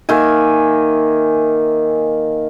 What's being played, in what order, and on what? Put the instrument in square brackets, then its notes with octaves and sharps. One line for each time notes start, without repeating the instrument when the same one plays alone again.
[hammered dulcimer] D#3 A#3 E5 G#5